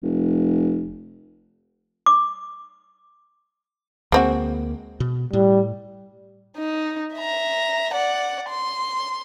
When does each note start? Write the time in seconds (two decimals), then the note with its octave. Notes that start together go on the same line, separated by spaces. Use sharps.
0.03 F1
2.06 D6
4.12 D2 G#3 A#3 C4 F#4
5.00 B2
5.33 A2 G3
6.57 D#4
7.15 E5 A#5
7.94 D5 F#5
8.49 C6